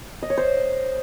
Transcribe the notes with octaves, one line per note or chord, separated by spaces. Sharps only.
D#5
C#5
C5